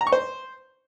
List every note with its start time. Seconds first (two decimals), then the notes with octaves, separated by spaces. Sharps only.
0.01 A#5
0.07 C#6
0.12 C5